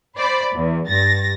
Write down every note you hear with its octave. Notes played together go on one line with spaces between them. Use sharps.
C5 D5 B5
E2
G2 A6 A#6